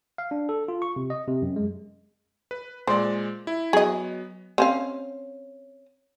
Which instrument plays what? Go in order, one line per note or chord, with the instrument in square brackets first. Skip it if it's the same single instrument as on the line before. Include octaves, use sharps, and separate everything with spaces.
[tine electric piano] F5
D4
A4
F4
C#6
C3
D#5
C3
F#2
G#3
[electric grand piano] B4
[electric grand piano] A#2 G#3 D5 [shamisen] C5
[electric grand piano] E4
[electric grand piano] F#3 B3 [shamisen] G#4 D#5
[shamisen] C4 C#4 F5